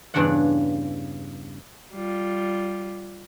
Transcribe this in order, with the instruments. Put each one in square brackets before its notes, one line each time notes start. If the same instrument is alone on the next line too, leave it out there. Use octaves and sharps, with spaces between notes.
[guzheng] E2 G2 C#3 D4 D5 F#5
[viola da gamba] G3 F4